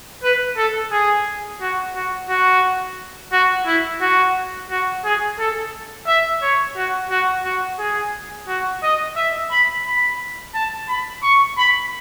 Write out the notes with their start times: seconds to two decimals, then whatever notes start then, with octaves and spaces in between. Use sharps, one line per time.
0.23 B4
0.57 A4
0.92 G#4
1.61 F#4
1.95 F#4
2.29 F#4
3.32 F#4
3.66 E4
4.01 F#4
4.70 F#4
5.05 G#4
5.39 A4
6.07 E5
6.43 C#5
6.76 F#4
7.10 F#4
7.44 F#4
7.79 G#4
8.48 F#4
8.83 D#5
9.16 E5
9.51 B5
9.86 B5
10.55 A5
10.89 B5
11.23 C#6
11.58 B5